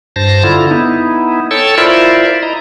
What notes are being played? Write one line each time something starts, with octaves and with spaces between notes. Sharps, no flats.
G2 C5 A5 A#6
D3 E4 F4
B3 D#4 E4
A4 C#5 G5 A5 E6
E4 F4 A#4 C5 D5 E5
E4 D#5 A#5